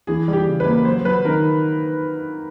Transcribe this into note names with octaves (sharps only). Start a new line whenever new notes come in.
E3 G#4
G3
G4
C#3
B4
A#3
F#3 C5
F#3 B4
D#3 A#4